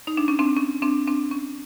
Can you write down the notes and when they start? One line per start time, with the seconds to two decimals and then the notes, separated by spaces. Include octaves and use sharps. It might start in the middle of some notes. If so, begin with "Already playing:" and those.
0.07 D#4
0.17 D4
0.28 C#4
0.39 C4 D4
0.57 C#4
0.82 C4 D4
1.07 C4 D4
1.31 C#4